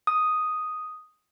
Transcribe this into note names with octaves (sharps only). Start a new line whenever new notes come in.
D#6